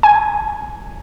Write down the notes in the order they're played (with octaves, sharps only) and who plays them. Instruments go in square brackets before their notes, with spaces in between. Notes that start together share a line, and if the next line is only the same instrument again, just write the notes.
[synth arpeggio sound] G#5